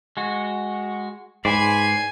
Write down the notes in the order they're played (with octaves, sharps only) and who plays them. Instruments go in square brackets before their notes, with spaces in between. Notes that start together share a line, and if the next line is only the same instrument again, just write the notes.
[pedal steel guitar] G#3 F#4
[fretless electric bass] G#2 [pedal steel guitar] B4 C5 D5 [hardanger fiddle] G#5